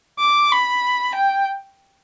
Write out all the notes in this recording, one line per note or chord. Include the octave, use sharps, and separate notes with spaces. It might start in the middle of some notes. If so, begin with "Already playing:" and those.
D6
B5
G5